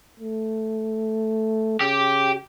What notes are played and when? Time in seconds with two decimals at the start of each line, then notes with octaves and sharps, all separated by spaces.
0.20 A3
1.81 C#3 G4